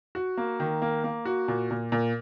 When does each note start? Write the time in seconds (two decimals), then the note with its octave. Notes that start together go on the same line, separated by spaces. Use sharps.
0.15 F#4
0.37 A#3
0.60 D#3
0.82 A#3
1.04 A#3
1.25 F#4
1.48 A#2
1.71 A#2
1.92 A#2